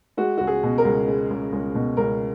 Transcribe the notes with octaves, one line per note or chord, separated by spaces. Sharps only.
G#3 F#4
C#2 F#4
G#4
B2
A#4
C#2
G#3
C#2
C#2
B2
C#2 A#4